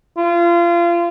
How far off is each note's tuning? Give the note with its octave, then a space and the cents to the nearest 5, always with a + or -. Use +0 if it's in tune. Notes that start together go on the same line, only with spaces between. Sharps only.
F4 -30